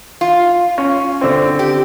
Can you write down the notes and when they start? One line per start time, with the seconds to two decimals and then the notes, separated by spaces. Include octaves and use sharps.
0.21 F4
0.78 C#4
1.21 D3 C4
1.59 G4